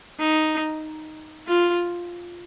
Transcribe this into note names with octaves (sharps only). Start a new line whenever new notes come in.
D#4
F4